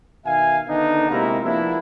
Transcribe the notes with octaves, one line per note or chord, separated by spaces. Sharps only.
B2 D#3 E5 F5 G#5
D3 D#3 B3 D4 D#4
C3 G#3 A#3 E4 F4 A#5
F3 A#3 B3 D4 E4